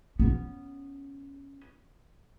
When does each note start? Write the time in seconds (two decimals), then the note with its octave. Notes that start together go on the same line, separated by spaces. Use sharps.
0.20 B3 C#4